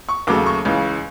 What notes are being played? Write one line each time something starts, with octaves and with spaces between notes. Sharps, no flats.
C#6
D#2 C#3 F#3 A3 D6
C#6
C#2 C#3 E3